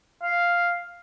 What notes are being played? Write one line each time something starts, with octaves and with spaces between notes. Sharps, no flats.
F5